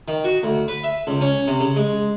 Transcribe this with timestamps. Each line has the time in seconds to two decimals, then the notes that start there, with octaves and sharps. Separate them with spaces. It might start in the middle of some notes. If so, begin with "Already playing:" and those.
0.08 D#3
0.24 F#4
0.43 D2
0.68 B4
0.83 E5
1.07 C#2
1.21 C#4
1.48 C3
1.60 C#3
1.76 G#3